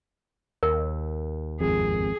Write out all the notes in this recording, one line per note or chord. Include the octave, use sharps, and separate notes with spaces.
D#2 A#4
G#1 F2 G#4